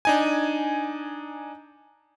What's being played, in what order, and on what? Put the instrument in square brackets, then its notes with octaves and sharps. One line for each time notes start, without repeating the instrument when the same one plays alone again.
[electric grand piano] D4 D#4 G#5